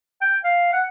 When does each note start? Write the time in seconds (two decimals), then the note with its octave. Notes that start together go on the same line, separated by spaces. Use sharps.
0.21 G5
0.44 F5
0.73 F#5